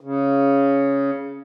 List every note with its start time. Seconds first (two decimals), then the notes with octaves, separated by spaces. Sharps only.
0.01 C#3